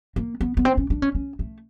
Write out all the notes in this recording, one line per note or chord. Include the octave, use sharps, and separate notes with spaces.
A#3
B3
B3
C4
C#4
D4
C#4
C#4
A3